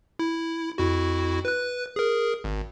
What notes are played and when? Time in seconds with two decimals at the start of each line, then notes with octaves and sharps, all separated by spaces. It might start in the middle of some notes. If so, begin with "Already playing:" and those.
0.19 E4
0.78 F2 E4 F#4
1.45 B4 F#6
1.96 G#4 A#4
2.44 G#1